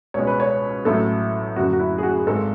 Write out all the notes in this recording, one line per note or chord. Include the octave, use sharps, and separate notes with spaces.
C#2 B2 G#3 C#5
B4
C#5
A1 A2 F#3 A3 A4
F#1 F#2 D3 F#3 A3 F#4
F#4
E4
G#4
F#4
G#4
G#1 G#2 G#3 A4